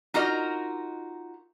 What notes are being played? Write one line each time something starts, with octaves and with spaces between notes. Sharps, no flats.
D#4 F4 F#4 A#4 D#5